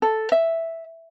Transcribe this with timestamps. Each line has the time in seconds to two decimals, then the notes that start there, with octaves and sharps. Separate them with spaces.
0.02 A4
0.32 E5